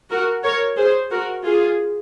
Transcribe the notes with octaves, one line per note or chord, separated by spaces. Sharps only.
F#4 A#4
A#4 C#5
G#4 C5
F#4 A#4
F4 G#4